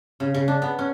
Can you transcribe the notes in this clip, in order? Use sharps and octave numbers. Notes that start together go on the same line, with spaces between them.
C#3
C#3
D4
B3
C#4